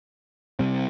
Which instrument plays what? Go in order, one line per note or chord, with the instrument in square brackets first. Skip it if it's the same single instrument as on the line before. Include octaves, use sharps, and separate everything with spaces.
[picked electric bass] C3 G3 C4